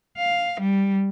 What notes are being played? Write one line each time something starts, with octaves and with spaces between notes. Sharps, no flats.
F5
G3